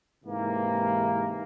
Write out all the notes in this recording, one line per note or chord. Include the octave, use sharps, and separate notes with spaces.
G#2 C3 E3 A#3